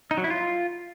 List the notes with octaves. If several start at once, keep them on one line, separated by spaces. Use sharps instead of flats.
D#4
F#3
E4
F4